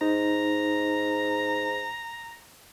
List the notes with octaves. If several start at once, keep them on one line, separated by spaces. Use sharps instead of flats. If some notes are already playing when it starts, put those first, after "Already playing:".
G#2 D#4 A#5